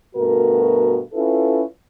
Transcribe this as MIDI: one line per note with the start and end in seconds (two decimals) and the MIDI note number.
0.16 0.99 43
0.16 0.99 47
0.16 0.99 57
0.16 0.99 66
0.16 0.99 70
1.13 1.62 61
1.13 1.62 64
1.13 1.62 65
1.13 1.62 69
1.13 1.62 71